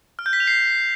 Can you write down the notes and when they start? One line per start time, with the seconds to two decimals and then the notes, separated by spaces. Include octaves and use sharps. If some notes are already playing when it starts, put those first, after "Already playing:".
0.19 F6
0.26 G6
0.33 B6
0.40 F7
0.47 C7